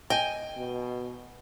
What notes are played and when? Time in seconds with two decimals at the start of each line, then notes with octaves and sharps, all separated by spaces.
0.10 D#5 G5 G#5
0.57 B2